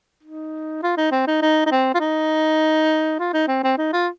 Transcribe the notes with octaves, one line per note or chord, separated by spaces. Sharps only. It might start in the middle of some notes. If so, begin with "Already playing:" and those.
D#4
F4
D#4
C4
D#4
D#4
D#4
C4
F4
D#4
F4
D#4
C4
C4
D#4
F4